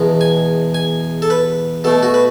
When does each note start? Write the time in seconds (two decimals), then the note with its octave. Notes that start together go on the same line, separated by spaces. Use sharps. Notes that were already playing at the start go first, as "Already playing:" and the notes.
Already playing: E2 B2 G#3 B3
0.21 G#5
0.74 G#5
1.22 A4
1.30 B4
1.84 B2 A3 A4
2.03 F#4
2.14 B4